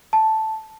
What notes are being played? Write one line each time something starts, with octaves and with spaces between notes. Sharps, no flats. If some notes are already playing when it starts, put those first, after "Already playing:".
A5